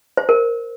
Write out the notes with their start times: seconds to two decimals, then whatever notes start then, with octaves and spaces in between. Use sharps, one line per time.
0.17 C5
0.29 A#4